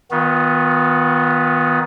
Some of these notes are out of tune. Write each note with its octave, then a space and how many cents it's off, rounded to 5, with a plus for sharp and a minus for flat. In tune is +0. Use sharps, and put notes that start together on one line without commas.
D#3 +25 B3 +0 F4 +35